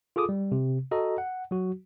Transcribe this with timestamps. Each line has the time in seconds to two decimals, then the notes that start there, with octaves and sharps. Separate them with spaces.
0.16 F4 G#4 A4 D6 D#6
0.29 G3
0.52 C3
0.91 F#4 A4 D#5 A#5
1.18 F#5
1.51 F#3 F#4